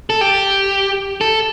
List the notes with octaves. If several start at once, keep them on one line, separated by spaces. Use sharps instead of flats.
A4
G4
A4